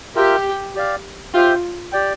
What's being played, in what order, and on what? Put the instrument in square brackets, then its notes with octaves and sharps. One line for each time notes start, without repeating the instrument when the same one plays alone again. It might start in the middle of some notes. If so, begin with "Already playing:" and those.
[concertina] F4 A#4 E5 G5 [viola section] G4
[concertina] G4 D5 F5
[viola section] F4 [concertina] G4 C5 E5 G5
[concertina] G4 D5 G5